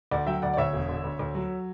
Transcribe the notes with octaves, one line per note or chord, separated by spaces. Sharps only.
D2 D5 F#5
F#3 E5 G5
D2 D5 F#5
D5
D2 C#5 E5
E1
D3
D2
D2
F#3